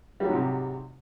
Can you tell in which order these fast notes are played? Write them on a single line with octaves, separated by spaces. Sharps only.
G3 F#3 G#2 C3